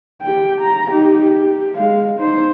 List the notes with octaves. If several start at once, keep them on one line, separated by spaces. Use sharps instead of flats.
G4 G5
A#5
D#4 G4
G4
G#3 F5
D#4 C5